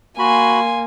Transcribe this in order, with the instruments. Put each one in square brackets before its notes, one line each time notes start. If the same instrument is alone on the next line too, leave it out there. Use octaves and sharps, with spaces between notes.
[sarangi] A#3 [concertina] F#4 B5 [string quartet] G#5 C6